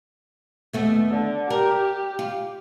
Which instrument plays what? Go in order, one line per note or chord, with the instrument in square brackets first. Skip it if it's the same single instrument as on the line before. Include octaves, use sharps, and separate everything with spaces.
[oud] D#2 A3 B3
[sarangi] D3
[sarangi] G4 [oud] A#4
[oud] F4